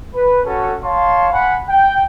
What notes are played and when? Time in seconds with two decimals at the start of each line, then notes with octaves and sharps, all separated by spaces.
0.15 B4
0.46 C#4 F#4 A4
0.83 C#5 F5 A5 C6
1.33 F#5 G#5 B5
1.70 G5